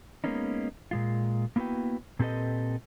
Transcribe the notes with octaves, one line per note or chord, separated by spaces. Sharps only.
G#3 A#3 B3 C#4 D#4
A#2 G#3 F4
A#3 B3 E4 F#4 B4 G5
A#2 C4 G4 A4 B4 D#5